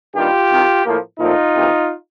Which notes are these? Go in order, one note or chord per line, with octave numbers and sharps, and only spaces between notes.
G2 D#3 G3 A#3 F4 G4
C2 C3 D#3
A2 F3 A#3
A#2 F3 A3 C4 D#4 F4
E2 C3 F3 A#3